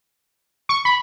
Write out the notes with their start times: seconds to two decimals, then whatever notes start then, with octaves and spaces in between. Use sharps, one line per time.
0.69 C#6
0.85 B5